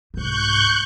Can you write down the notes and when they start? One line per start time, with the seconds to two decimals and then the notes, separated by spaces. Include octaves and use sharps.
0.14 C2 G#2 C#6 F#6 G6